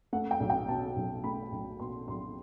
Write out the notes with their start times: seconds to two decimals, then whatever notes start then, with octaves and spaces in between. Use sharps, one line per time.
0.13 A3 F#5
0.31 G5
0.40 B1
0.50 G5
0.68 B2 A5
0.96 B1
1.24 A3 B5
1.52 B1
1.79 B2 C6
2.08 B1 C6